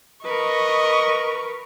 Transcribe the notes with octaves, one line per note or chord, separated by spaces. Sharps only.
A#4 B4 D#5 C#6